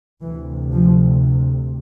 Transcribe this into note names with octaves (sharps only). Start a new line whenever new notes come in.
D2 C3 E3
F3